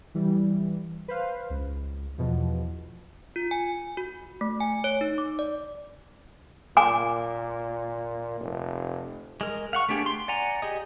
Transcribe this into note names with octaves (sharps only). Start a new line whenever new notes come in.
E3 G3
B4 C5 F5
C#2
E2 B2 F3
F4
G#5
F#4
A3
G#5
C#5
D#4
D6
D5
A#2 G#5 D6
F1
G#3 A#4
F5 F#5 C#6
A3 B3 D4 G4 G#4
C6
D5 F#5 G#5 A#5
G4 G#4 D#5